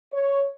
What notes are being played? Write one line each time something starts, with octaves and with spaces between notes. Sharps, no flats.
C#5